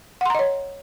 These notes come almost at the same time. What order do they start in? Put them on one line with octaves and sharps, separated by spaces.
F#5 C6 A#5 D#5 C#5